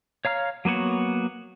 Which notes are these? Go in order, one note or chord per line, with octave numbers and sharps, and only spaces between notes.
C#5 F5 A#5 F6
F#3 A#3 B3 F#4 C#5